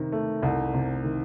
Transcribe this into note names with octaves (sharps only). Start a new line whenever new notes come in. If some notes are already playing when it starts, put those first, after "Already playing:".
Already playing: C3 D#3
A3
C2
C3
D#3